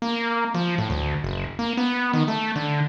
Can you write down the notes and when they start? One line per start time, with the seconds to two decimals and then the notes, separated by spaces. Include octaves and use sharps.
0.02 A#3
0.54 F3
0.78 A2
0.90 D2
1.24 F#1
1.59 A#3
1.77 B3
2.13 D#3
2.28 A3
2.56 D3